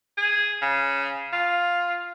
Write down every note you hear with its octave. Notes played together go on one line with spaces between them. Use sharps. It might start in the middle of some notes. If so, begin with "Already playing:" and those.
G#4
C#3
F4